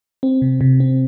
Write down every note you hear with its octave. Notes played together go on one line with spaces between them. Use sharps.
C4
C3
C3
C4